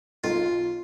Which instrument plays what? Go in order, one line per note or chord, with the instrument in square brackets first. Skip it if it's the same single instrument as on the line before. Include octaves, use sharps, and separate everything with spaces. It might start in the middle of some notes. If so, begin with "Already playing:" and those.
[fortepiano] B1 [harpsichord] F4